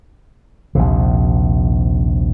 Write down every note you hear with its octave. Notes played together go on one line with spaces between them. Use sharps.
A#1 D#2 C3